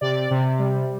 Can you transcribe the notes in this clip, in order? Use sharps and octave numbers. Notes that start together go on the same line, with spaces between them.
C3 D5
C3
G3